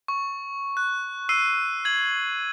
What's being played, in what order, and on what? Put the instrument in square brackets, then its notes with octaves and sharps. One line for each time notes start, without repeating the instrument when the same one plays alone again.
[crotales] C#6
F#6
E6 C7 D#7
G#6 F#7